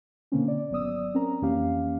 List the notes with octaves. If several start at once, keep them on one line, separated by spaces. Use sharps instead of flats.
B2 D3 A#3 C4 C#4
D5
G#1 F#3 B3 D5 D#6 E6
C4 C#4 A#4 A#5
F2 E3 A#3 C#4 G4 F5